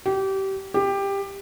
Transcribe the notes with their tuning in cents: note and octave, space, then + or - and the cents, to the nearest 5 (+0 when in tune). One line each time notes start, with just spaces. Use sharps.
G4 -25
G4 +15